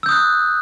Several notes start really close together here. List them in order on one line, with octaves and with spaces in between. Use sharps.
E6 G6 D#6 F#6